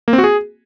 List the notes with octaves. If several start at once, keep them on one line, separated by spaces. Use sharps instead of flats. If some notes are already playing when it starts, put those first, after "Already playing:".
A#3
C4
F#4
G#4